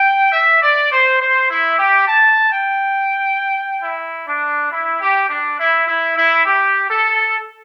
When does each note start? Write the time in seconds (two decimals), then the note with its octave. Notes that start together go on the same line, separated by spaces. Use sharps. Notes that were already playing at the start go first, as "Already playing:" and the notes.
Already playing: G5
0.32 E5
0.62 D5
0.91 C5
1.20 C5
1.50 E4
1.79 G4
2.08 A5
2.52 G5
3.83 E4
4.27 D4
4.71 E4
5.00 G4
5.29 D4
5.58 E4
5.88 E4
6.16 E4
6.46 G4
6.90 A4